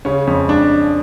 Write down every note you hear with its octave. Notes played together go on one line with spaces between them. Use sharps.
C#3 C#4
F2 C#4
D4